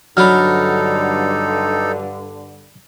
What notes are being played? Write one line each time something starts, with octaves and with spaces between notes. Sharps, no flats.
G2 D3 F#3 D4 D#4 A4 B5 F6